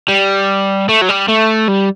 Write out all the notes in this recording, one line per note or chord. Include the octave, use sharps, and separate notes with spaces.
G3
A3
F#3
G3
A3
G3